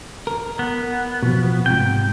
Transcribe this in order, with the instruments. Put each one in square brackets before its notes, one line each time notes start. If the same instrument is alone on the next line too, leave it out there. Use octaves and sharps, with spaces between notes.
[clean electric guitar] A#4
[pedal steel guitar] B3
[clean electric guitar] B2 F3
[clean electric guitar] G#2 C3 [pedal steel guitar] G5